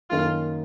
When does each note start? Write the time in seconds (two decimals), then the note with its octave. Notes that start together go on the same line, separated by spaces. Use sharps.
0.10 F#2 D#3 A#3 F4